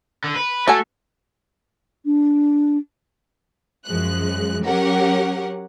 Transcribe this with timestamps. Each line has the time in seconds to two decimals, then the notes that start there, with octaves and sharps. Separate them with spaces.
0.24 D3
0.36 B4
0.68 A3 F#4 A4 G#5
2.05 D4
3.86 F#2 F3 G#3 F#6
4.65 F#3 C#4 G4 A#4 F#5